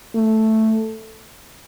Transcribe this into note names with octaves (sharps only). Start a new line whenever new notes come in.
A3